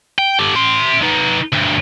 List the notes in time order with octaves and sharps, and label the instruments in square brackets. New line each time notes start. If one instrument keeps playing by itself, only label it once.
[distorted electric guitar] G5
G4 A4
E5 C6
D#4 B4
D2 G2